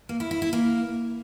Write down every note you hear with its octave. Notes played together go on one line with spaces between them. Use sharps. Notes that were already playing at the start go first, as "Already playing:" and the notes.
A#3
E4
E4
E4
A#3